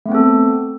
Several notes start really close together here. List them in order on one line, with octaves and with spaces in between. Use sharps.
A3 B3 C4 A4